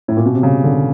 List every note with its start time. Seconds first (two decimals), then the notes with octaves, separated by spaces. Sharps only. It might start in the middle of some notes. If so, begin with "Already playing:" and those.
0.08 A2
0.17 A#2
0.26 B2
0.34 C3
0.43 C#3
0.64 D3